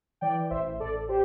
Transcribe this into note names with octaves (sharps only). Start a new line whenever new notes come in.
E3 D5 G5
A1 C5 E5
A1 A4 D5
G4 C5